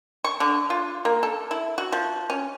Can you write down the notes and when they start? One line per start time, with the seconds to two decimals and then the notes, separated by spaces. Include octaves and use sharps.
0.24 C#6
0.40 D3
0.70 F4
1.05 A#3
1.23 A4
1.51 E4
1.78 F#4
1.92 F3
2.30 C#4